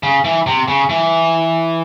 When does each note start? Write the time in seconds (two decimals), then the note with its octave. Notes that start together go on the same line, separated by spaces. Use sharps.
0.03 C#3
0.24 E3
0.46 C3
0.68 C#3
0.89 E3